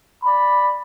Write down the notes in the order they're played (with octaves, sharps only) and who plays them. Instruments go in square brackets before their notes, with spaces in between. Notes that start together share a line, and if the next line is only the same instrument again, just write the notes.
[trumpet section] D5 B5